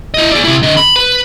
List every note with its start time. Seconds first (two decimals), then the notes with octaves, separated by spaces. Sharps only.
0.14 E4 D#5
0.31 G#4 D5
0.44 C3 E4
0.63 D3 D#5
0.77 B5
0.96 B4